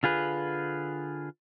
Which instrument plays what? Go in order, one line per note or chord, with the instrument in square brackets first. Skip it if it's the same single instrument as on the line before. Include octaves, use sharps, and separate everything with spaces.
[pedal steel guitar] D3 F4 G#4 B4